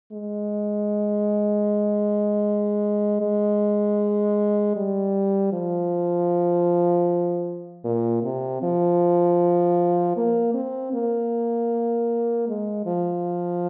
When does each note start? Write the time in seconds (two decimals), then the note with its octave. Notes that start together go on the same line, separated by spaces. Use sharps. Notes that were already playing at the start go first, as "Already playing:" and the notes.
0.12 G#3
3.21 G#3
4.76 G3
5.52 F3
7.84 A#2
8.23 C3
8.62 F3
10.17 A#3
10.54 C4
10.93 A#3
12.48 G#3
12.86 F3